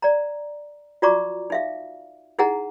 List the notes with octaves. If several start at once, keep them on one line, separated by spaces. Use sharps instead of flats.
D5 A#5
F4 F#4 D5 A#5 C#6 D6
D#4 E5 F5
D#4 E4 G#4 F#5 G#5 A#5